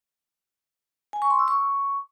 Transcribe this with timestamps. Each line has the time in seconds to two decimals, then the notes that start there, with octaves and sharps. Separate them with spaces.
1.13 G#5
1.22 C#6
1.30 C6
1.39 E6
1.48 C#6